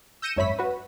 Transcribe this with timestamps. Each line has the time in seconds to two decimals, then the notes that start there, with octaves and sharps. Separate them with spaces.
0.22 E6 G6 A#6 C#7 D#7 E7
0.36 G#1 F#2 C#5 E5 B5 B6
0.59 F#4 B4